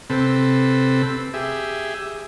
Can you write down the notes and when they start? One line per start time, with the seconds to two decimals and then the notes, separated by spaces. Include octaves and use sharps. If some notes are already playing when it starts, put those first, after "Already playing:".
0.10 C3 C4 A4 B4
1.34 G4 G#4 E5